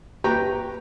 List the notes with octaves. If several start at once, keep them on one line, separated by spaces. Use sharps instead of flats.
G4 B4 G5 A#5 C#6